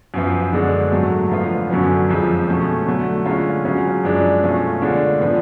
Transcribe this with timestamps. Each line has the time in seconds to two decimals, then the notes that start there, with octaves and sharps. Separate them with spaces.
0.14 F#2 F3 B3 F4
0.53 F#2 D3 G#3 D4
0.92 G#2 F#3 A3
1.31 D3 F3 B3 F4
1.70 F#2 D3 F#3 C#4
2.09 F2 F3 G#3
2.48 B2 A3 C#4
2.86 D3 F#3 A3
3.26 D3 G#3 C#4 F4
3.65 C#3 F#3 C#4 F4
4.04 F#2 F3 G#3 D4
4.42 B2 A3 C#4 F4
4.82 D3 G#3 D4 F4
5.20 A2 F3 B3 D4